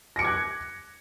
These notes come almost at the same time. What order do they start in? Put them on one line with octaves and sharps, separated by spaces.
A#6 C#7 D6 G#6 F#6